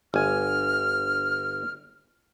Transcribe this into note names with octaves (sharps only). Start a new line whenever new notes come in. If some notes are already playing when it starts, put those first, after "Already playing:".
G1 G#5 F6